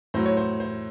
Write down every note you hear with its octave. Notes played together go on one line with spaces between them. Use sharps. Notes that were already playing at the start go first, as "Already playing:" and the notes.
A2 F#3 C5
C#5
C5
C5